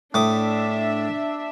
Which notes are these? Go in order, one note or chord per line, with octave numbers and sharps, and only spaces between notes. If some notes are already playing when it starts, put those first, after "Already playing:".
A2 D4 E5 D6 D#6